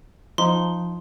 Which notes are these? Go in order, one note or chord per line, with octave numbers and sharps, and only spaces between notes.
F3 D#4 C6